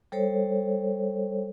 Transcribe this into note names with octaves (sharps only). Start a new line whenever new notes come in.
G3 A4 C5 C#5